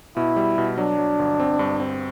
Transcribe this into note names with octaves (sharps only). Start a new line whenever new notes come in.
B2 E4
G3
B2
F#3 D4
F#3
G1
C4
G2
C4